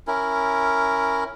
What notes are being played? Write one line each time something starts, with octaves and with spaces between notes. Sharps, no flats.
C#4 E4 A#4